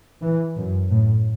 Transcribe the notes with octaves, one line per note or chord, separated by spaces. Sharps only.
E3
F#2
A2